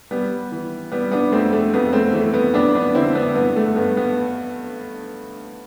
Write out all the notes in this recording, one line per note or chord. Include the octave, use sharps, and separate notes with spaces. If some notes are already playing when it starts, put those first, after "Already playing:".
G3 B3
E3
G3 B3
B3 D4
F2 A3 C4
A3
F2 B3
A3 C4
E3 A3
B3
F2 B3 D4
B3 D4
D3 C4 E4
B3 D4
G2 B3
A3
G2 B3
B3